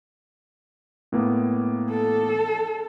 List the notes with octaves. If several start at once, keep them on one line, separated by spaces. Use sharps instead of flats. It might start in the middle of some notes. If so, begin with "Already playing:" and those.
A2 A#3 B3
A4